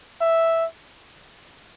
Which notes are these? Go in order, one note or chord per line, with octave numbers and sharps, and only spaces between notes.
E5